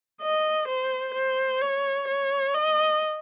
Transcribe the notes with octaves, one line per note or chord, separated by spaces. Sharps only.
D#5
C5
C5
C#5
C#5
D#5